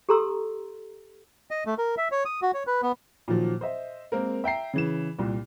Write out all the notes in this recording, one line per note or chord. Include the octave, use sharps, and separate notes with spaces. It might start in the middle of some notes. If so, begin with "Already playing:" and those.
G4 A4 A#5 C6 E6
D#5
A3
A#4
E5
C#5
D#6
F#4
C#5
B4
B3
A#2 D#3 F3 F#3
C5 D#5 E5
G#3 A#3 C4 A#4
E5 G5 A#5 C7
C#3 E3 E7
C2 A#2